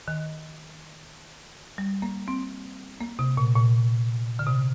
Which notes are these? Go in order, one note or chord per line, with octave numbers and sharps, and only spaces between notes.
D#3
G3
A#3
C4
A#3
C3
A#2
A#2
D3
C3